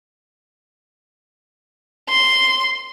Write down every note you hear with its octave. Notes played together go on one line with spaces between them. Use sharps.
C6